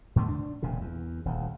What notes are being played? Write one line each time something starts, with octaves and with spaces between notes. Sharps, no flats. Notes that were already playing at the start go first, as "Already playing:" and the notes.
G#2 D3 A3 B3
D4
E1 A#2 C#3
E2
D#1 D2